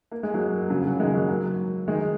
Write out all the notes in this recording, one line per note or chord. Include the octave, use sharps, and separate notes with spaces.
A#3
G#3
F#3 A#3
C#3 F#3
C#3 F#3
D#3 G#3
F#3 A#3
F#3 A#3
D#3 G#3